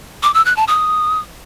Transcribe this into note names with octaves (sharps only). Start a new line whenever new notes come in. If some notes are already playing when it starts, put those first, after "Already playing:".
D6
E6
F#6
A5
D#6